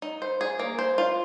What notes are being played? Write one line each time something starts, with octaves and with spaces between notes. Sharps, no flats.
D#4
C5
G#4
A#3
C5
F4